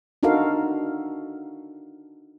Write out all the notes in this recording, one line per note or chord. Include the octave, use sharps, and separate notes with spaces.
D4 D#4 F#4 A4 A#4 F5